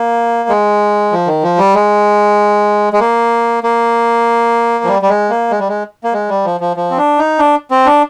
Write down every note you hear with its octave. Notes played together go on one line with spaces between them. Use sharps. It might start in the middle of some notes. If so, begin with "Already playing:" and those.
Already playing: A#3
G#3
F3
D#3
F3
G3
G#3
G#3
A#3
A#3
F3
G3
G3
G#3
A#3
G#3
G3
G#3
A#3
G#3
G3
F3
F3
F3
C4
D4
D#4
D4
C4
D4